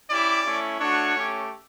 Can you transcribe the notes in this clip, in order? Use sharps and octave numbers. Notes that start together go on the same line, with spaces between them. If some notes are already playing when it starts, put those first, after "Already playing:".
C#4 E4 G4 D5
A3 C#4 E4
A3 D4 F#4 C#5
A3 C#4 G4